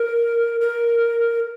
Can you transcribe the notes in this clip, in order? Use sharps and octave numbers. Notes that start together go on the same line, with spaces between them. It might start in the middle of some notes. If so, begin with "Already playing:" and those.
Already playing: A#4
A#4